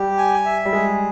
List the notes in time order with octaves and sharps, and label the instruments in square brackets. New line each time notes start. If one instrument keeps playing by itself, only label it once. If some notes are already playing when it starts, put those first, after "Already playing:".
Already playing: [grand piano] G3 [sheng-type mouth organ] G4
[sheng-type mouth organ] G#5
E5
[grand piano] G3
[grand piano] G#3 [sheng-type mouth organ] G#4